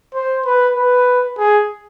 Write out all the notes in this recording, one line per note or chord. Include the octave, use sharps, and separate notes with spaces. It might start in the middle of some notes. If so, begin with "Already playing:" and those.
C5
B4
B4
G#4